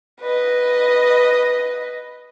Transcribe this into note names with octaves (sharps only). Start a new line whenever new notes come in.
B4 D#5